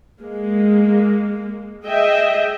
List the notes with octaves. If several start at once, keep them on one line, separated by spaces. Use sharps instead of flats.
G#3 A#3
G#4 D#5 E5 G5